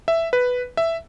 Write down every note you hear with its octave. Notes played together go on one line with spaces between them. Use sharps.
E5
B4
E5